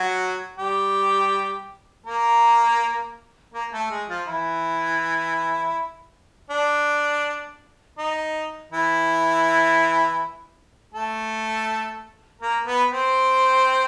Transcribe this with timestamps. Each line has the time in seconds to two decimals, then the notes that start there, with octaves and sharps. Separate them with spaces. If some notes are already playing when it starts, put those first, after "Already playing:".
Already playing: F#3 F#4
0.58 G3 G4
2.06 A#3 A#4
3.54 A#3 A#4
3.73 A3 A4
3.90 G#3 G#4
4.09 F3 F4
4.28 E3 E4
6.50 D4
7.98 D#4
8.72 E3 E4
10.93 A3 A4
12.41 A#3 A#4
12.66 B3 B4
12.91 C4 C5